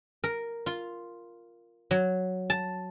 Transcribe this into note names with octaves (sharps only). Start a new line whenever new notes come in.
A#4
F4
F#3
A5